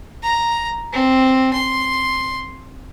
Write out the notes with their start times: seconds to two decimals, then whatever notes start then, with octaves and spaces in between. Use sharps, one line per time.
0.22 A#5
0.93 C4
1.53 C6